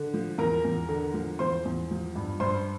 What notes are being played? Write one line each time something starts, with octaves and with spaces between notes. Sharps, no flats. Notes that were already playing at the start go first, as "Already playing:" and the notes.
Already playing: D3
F3
E2 A#4 A#5
E2
D3
F3
E2 C5 C6
E2
F3
G2
G2 C5 C6